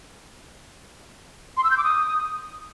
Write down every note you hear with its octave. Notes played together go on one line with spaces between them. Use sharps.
C6
E6
G6
D6
D#6